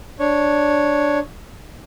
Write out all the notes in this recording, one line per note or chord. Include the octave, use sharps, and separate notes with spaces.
D4 C#5